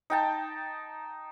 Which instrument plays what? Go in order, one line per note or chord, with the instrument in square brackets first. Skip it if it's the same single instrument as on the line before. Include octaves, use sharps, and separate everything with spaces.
[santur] D#4 G5 A5